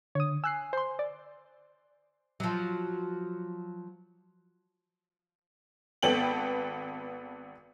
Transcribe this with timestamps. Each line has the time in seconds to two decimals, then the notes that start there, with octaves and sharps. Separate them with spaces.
0.15 D3 C#5 D#6
0.44 G#5 E6 F#6 C7
0.73 C5 C6
0.99 D5
2.40 F3 F#3
6.03 G#1 B3 A4 G5 F#7